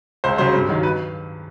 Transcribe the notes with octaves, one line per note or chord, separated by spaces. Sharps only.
C#2 C5
C#3 F#3 C5
G2
D#3 F#3
B4